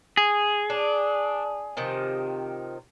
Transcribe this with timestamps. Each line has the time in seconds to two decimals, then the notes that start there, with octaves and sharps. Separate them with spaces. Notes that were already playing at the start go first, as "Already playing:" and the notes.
0.17 G#4
0.70 D4
1.77 C3 D#3 F3